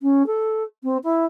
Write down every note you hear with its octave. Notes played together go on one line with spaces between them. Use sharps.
C#4
A4
C4
E4